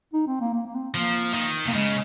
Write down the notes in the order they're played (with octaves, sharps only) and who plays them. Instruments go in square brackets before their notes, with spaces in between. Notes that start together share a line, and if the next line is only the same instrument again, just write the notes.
[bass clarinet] D#4
C4
A#3
A#3
A#3
C4
[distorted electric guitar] F3 [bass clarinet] A#3
[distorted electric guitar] D#3
[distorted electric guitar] C3 [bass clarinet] A#3
[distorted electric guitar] C#3 [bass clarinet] G#3